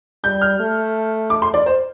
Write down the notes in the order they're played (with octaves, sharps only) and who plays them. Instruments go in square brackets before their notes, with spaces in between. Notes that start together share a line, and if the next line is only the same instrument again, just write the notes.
[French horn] G3 [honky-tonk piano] G6
[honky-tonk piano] F6
[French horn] A3
[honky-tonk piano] D6
C6
D5
C5